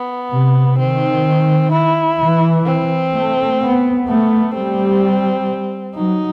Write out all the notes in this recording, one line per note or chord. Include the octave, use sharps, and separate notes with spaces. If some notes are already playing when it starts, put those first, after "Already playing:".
Already playing: B3
C3
D#3 C4
E4
E3
C4
A3
B3
A3 B3
G3 C4
F#3 D#4